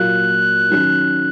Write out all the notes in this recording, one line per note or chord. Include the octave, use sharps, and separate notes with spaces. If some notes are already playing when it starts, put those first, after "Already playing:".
Already playing: A#2 F#3 A#3 F4 F#6
D#3 F#3 C#4